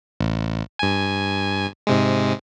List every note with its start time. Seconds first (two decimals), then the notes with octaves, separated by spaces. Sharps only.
0.20 A1
0.79 G2 G#5
1.87 G#2 C3 G#3